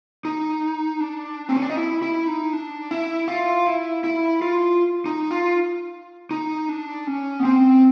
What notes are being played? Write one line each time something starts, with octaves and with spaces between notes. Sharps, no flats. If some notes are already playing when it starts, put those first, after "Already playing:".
D#4
D4
C4
C#4
D4
D#4
E4
E4
D#4
D4
E4
F4
E4
E4
F4
D#4
F4
D#4
D4
C#4
B3
C4